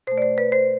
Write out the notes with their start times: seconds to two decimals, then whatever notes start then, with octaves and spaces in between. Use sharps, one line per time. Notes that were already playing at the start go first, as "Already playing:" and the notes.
0.07 B2 C5
0.11 A3
0.18 D5
0.22 C5
0.38 B4
0.52 C5